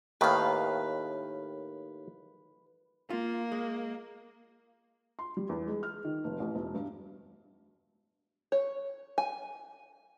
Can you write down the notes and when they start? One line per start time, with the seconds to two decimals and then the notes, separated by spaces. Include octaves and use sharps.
0.21 D#2 A2 D#3 B4 F5
3.10 A#3 F4
3.52 G#3
5.19 C6
5.37 G3
5.49 E2
5.67 G#3
5.83 F6
6.05 D#3
6.24 F1
6.40 A1
6.55 E1
6.75 G2
8.52 C#5
9.18 G#5